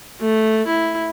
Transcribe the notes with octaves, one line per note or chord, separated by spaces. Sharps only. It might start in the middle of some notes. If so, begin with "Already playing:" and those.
A3
E4